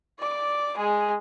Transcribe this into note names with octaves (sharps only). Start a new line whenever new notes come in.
D5 D6
G#3 G#4